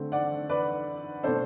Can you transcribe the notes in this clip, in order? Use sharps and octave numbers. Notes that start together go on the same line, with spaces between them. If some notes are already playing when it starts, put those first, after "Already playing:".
Already playing: D3 A3 C4
D5 F#5
B4 D5
B2 A3 D4 A4 C5